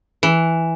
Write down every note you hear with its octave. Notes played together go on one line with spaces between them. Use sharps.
E3